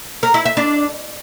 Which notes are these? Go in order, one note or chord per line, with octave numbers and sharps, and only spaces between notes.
A#4
E4
E5
D4